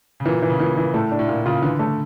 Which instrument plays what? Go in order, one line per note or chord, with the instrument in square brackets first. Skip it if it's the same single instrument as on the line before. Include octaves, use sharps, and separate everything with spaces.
[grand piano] C#3
[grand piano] A#2 [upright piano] E3
[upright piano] E3
[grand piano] C#3
[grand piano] A#2 [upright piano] E3
[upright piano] E3
[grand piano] A2 [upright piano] A3
[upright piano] D4
[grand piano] A2
[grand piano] A#2 [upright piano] F4
[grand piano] C#3 [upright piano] F4
[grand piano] D3 [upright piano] E3
[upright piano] A3